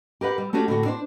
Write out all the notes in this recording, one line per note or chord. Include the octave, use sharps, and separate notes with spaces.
G4 A#4 B4 F#5
G3
A3 C#4 D4 F#4 G4
A2 D3 F#4
D4 C5